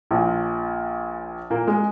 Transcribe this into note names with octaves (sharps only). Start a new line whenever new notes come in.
A#1 A#2
A#2 A#3
G#3